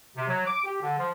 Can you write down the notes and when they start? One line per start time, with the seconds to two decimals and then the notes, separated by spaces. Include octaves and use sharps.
0.16 C3
0.28 F#3
0.46 D6
0.65 G4
0.82 D3
0.98 F3